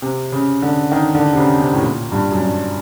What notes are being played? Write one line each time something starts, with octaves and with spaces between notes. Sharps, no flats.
C3
C#3
D3
D#3
D3
C3
C#3
C3
A2
A#2
G2
F#2
G2